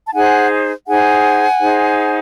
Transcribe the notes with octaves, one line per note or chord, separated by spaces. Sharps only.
A5
D#4 G#4 C5 F#5 G#5
D#4 G#4 C5 F#5 G#5
D#4 G#4 C5